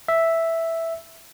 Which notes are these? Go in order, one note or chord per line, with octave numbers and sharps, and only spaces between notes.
E5